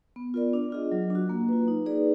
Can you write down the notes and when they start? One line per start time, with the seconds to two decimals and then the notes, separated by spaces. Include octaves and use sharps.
0.16 B3
0.34 F4 A#4 D5
0.53 D4
0.72 F4 G#4 D#5
0.92 F#3
1.10 D4
1.15 F#4
1.29 A#3
1.49 F4 B4
1.68 D#4
1.86 G#4 B4 D5